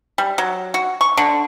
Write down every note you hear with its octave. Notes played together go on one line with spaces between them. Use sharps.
G3
F#3
F#4
C#6
D3